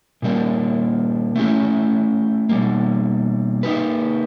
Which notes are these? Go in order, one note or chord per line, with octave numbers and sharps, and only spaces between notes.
A#2 G3 A#3 D4
A3 C#4 E4 G4
B2 G3 A#3
A#3 D#4 G4 B4